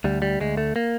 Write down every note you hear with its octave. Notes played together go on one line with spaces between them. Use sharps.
D2 G3
G3
D2 G#3
A3
A#3